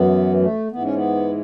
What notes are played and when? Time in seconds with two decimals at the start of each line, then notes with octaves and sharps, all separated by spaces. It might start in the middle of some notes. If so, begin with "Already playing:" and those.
Already playing: F#2 E3 B3
0.40 A3
0.71 G#2 E3 B3
0.83 C#4
0.95 B3